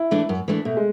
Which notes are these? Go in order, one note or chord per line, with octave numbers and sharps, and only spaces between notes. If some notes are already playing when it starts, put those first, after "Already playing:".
Already playing: E4
E3 A3 D4
F#2
E3 A3 D4
B2 A3
G#3